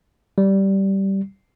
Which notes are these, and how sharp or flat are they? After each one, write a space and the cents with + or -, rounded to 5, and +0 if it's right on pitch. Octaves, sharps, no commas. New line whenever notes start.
G3 -10